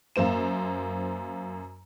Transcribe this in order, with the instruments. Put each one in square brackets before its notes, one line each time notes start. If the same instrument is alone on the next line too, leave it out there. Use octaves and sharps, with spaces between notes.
[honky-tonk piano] F#2 A#3 C5 E7